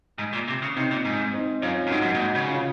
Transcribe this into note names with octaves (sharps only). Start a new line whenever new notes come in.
G#2
A#2
C3
C#3
C3 C4 D#4
A#2
G#2
C4 D#4
F#2 C#4 F4
F#2
G#2 D#4 F#4
G#2
F#2
A#2
G#2
C#3
C#4 F4